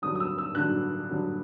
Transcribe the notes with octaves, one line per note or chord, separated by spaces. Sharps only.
G2 D3 F#3 D#6
D#6
E6
E6
G2 D3 F#3 F#6
G2 D3 F#3